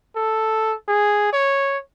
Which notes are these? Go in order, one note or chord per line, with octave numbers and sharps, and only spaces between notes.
A4
G#4
C#5